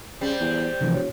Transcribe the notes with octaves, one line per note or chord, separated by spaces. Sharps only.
C#3 G3 C4
E2
E1 C3 E3 F3
F#4 C#5